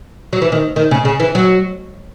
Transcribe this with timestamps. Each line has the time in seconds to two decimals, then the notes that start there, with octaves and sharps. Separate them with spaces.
0.33 F#3
0.42 E3
0.52 D#3
0.76 D#3
0.91 C#3
1.05 C#3
1.20 E3
1.35 F#3